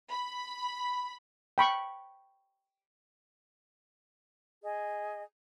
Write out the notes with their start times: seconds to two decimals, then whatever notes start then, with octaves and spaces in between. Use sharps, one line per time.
0.11 B5
1.58 G5 B5 C#6
4.62 G#4 D#5